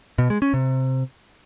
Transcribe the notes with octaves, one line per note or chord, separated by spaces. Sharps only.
B2
G#3
C#4
C3